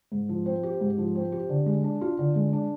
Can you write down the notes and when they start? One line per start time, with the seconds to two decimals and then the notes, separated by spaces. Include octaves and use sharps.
0.12 G#2
0.29 F3
0.46 C4
0.63 G4
0.81 G#2
0.98 F3
1.15 C4
1.32 G4
1.49 D3
1.66 G#3
1.84 D4
2.01 F4
2.19 D3
2.35 G#3
2.53 D4